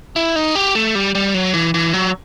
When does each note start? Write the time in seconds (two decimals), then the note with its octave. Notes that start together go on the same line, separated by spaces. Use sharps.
0.16 E4
0.36 D#4
0.55 G4
0.75 A3
0.95 G3
1.15 G3
1.34 F#3
1.54 E3
1.74 E3
1.93 F#3